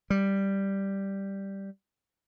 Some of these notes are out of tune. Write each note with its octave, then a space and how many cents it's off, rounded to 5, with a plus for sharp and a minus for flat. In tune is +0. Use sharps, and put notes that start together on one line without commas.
G3 +0